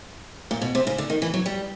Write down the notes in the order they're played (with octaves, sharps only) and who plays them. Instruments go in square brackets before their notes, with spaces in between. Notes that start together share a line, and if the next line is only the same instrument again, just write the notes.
[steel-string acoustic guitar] A#2
B2
C3
C#3
D3
D#3
E3
F#3
G3